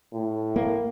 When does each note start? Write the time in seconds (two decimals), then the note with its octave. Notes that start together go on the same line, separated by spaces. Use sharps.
0.13 A2
0.56 A#3